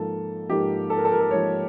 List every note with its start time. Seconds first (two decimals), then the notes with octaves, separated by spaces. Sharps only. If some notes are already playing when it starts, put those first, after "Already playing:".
Already playing: G#2 F3 A#3 A4
0.49 G#2 F3 A#3 G4
0.90 A4
0.97 A#4
1.05 A4
1.12 A#4
1.20 A4
1.31 G#2 F3 A#3 C#5